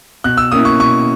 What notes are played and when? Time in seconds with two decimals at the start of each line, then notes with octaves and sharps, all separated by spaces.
0.24 B2 F#6
0.37 E6
0.52 A#3 C#4 E4 D#6
0.65 C#6
0.79 B2 C#6